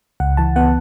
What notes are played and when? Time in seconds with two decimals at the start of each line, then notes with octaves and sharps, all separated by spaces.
0.20 C#2 F#5
0.37 E3 A5
0.56 B3 F#5